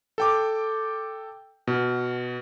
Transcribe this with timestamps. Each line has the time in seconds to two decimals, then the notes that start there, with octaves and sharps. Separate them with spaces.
0.18 A4 G5 D6
1.67 B2